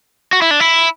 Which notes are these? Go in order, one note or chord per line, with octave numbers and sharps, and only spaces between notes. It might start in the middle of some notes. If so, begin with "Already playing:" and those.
F#4
E4
D4
E4